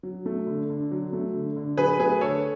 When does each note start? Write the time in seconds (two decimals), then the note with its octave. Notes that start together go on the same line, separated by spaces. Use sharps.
0.03 F#3
0.26 A3
0.47 D3
0.70 D3
0.91 F#3
1.13 A3
1.34 D3
1.56 D3
1.78 F#3 G#4 B4
1.99 A3 G#4 B4
2.21 D3 A4 C#5